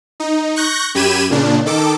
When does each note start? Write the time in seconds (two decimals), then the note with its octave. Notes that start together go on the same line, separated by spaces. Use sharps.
0.20 D#4
0.56 C#6 F#6 G6 A#6
0.95 F#2 G4 B5 G#6 D#7 E7
1.30 A#2 C#3 D4
1.66 D#3 A4 D6